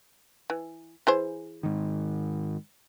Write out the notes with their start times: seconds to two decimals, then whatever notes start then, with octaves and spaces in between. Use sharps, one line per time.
0.50 E3
1.07 E3 G#4 C5
1.63 G#2 D#3